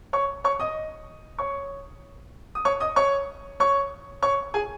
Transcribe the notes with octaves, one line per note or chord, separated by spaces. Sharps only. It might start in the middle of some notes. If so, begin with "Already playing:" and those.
C#5 C#6
C#5 C#6
D#5 D#6
C#5 C#6
D#6
C#5 C#6
D#5 D#6
C#5 C#6
C#5 C#6
C#5 C#6
G#4 G#5